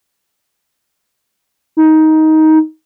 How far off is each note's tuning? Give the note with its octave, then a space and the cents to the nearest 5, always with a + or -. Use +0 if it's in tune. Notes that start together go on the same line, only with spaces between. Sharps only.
D#4 +15